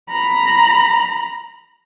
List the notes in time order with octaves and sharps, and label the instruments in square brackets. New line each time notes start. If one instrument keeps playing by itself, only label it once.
[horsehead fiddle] A#5 B5